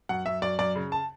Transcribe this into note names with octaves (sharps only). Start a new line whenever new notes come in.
F#2 F#5
F#2 E5
F#2 D5
F#2 D5
C#3
A5